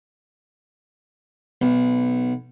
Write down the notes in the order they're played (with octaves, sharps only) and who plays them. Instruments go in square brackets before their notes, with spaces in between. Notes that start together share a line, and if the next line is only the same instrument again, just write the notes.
[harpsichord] B1